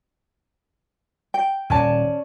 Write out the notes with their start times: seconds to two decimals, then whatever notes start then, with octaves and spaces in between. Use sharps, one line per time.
1.34 G5
1.70 D#1 C#4 D5 A5